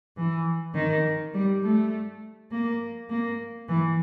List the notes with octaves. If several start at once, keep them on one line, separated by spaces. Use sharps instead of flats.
E3
D#3
G3
A3
A#3
A#3
E3